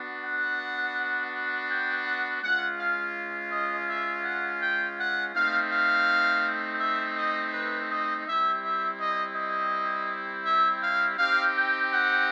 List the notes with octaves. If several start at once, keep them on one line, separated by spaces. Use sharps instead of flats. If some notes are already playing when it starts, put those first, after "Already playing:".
Already playing: B3 D4 F#4
F#5
G5
F#5
G#3 C#4 F4 F#5
F5
D#5
E5
F#5
G5
F#5
A3 C4 D#4 F5
F5
E5
D#5
B4
D#5
G3 C4 E4 G4 E5
E5
D#5
D#5
E5
F5
C4 D#4 G4 F5
G5
F#5